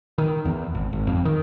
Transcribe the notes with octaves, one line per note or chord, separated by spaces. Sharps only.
D#3
E2
G#1
G#1
F2
D#3